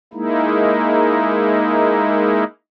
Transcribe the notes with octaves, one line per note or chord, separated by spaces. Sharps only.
G#3 A#3 D#4 E4